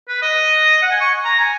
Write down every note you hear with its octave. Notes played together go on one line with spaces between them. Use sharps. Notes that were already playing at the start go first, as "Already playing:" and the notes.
B4
D#5
F#5
G#5
C#6
A#5
G#5